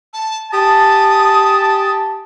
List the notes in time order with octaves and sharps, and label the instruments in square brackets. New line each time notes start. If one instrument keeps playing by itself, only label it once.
[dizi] A5
[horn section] G4 G#5 A5 [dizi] D#6